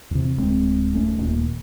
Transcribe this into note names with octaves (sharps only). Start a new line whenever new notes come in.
E2 C3
D1 G2 G#3 C4
D#1 A3 C#4
D#1 A#2